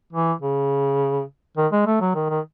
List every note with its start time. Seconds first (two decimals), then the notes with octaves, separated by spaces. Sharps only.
0.13 E3
0.42 C#3
1.57 D#3
1.72 G#3
1.86 A3
2.01 F#3
2.15 D#3
2.30 D#3